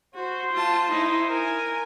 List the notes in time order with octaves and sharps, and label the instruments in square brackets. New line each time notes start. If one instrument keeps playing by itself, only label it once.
[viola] F#4 [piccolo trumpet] C5
[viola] F4 A5
D#4 E4
[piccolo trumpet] A#4 [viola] G#5